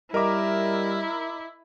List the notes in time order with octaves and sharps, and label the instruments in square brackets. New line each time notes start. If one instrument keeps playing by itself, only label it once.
[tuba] G3 [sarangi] E4 [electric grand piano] A#4 E5 [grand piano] D#5 A#5 D6